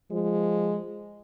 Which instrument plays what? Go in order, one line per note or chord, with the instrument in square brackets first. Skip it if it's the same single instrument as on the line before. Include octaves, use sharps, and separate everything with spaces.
[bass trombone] F3 [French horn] G#3